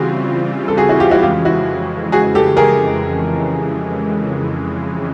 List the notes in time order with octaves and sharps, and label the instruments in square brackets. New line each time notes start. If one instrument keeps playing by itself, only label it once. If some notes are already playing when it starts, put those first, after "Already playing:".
Already playing: [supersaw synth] C#3 E3 G3 C4 F4 [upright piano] F#4 G#4
[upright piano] A4
F#4 G#4
E4 F#4
F4 G4
E4 F#4
[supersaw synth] F2 C#3 E3 G#3 [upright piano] F4 G4
[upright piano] E4 F#4
F#4 G#4
G4 A4
G#4 A#4